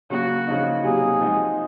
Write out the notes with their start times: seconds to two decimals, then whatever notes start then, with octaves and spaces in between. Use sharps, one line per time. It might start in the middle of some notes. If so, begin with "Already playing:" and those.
0.10 C#3 F#3 A#3 F#4
0.47 C#3 F3 A#3 D#4
0.84 C3 F#3 A#3 D#4 G#4
1.21 F3 G#3 D#4 F#4